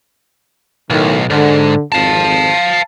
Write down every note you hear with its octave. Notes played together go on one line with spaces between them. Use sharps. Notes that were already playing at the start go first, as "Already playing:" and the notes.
B1 A2 D#3
G#2 D3
G#1 F2 F5 A5